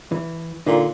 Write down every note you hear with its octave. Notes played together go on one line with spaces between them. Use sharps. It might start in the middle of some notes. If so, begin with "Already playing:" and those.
E3
A#2 D3 D#4